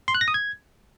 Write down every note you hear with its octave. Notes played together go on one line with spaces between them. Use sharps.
C6
F#6
A#6
D#6
G#6